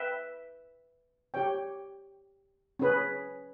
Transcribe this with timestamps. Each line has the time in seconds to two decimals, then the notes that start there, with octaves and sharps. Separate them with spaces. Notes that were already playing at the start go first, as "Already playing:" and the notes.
Already playing: B4 E5 G5
1.34 G4 C#5 G5
2.79 C#4 G#4 B4